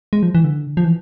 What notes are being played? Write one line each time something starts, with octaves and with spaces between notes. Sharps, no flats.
G#3
F3
E3
D3
F3
E3